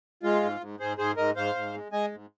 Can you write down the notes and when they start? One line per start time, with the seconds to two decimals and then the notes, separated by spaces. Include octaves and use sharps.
0.23 G#3 F4
0.43 G#2
0.61 G#2
0.80 G#2 G#4 C5
0.98 G#2 G#4 C5
1.17 G#2 A#4 D#5
1.36 G#2 C5 F5
1.55 G#2
1.74 G#3
1.92 G#3 D#5 G#5
2.12 G#2